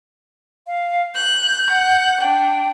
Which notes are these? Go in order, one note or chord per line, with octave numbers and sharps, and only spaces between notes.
F5
F#6 G6
F#5 F#6
D4 G5